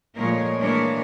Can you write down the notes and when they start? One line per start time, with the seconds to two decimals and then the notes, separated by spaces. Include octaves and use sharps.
0.16 A#2 F3 G#3 A3 A#4 C#5
0.57 E3 G#3 A#3 D4 A#4 C#5